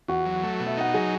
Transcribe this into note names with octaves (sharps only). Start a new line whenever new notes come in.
E2 F#4 F#5
F#3
A3
B2
E5
D#4 F#5
F#3 G#4 G#5